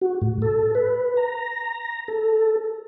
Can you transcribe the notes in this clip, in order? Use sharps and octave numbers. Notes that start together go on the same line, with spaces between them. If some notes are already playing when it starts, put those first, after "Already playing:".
F#4
A2
A4
B4
A#5
A4